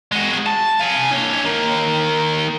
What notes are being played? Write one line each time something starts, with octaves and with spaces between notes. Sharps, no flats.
G#3 F#4
A5
F5 G#5
D4 C#5
D#3 A#3